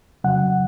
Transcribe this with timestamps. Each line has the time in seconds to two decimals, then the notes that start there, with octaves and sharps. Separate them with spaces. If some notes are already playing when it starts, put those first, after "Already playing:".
0.24 F2 C#3 F#3 F#5